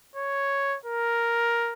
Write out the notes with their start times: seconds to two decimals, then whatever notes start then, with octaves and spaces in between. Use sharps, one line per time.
0.16 C#5
0.85 A#4